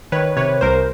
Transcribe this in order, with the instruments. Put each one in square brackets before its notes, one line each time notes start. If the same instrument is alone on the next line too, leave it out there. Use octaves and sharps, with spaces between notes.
[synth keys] D#3 B4 C#5
C3 B4 C#5
C2 A#4 C5